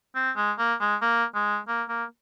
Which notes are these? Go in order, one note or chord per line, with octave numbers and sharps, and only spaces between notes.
C4
G#3
A#3
G#3
A#3
G#3
A#3
A#3